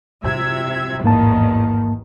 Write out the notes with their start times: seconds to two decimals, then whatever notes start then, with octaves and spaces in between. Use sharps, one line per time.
0.24 C3 E5 G#6
1.04 A1 E2 G#2 D#3 A#3 A5